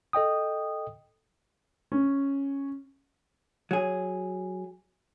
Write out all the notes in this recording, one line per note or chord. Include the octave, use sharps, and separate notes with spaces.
A4 D#5 G5 D#6
C#4
F#3 G#4